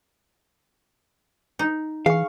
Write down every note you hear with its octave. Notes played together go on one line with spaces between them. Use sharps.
D#4
E3 G#4 F5 C#6